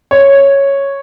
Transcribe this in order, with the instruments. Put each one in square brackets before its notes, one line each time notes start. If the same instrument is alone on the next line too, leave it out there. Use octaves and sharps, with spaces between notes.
[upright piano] C#5